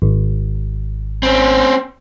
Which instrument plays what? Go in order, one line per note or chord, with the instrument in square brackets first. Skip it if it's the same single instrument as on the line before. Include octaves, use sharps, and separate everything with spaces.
[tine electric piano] G#1
[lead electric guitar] C4 C#4